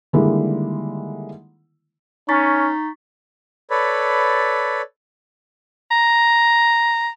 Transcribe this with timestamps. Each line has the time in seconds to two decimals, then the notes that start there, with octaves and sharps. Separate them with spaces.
0.13 D3 D#3 G3 G#3 A#3 E4
2.29 C#4 D#4 C#6 A6 B6
3.70 A4 B4 C#5 D5 B5
5.91 A#5